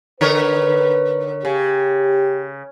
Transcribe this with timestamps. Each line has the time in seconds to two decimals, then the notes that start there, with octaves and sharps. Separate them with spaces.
0.21 D3 A#4 B4 C#5
1.45 C#3 G4